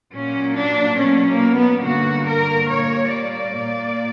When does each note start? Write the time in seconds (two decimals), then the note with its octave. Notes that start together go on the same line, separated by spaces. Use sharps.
0.14 A#2 F#3 A#3 C#4
0.56 D4
0.99 B2 F#3 A#3 C#4
1.28 A#3
1.55 B3
1.83 G2 D3 A#3 F#4
2.26 A#4
2.69 A#2 G3 A#3 C#5
3.10 D5
3.54 A#2 A#3